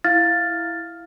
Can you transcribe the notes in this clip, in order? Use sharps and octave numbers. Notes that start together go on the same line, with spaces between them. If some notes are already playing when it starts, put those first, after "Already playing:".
E4 F5 F6 A6